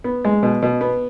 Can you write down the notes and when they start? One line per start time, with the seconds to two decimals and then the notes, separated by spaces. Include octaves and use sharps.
0.04 B3
0.25 G#3
0.43 B2
0.62 B2
0.81 B3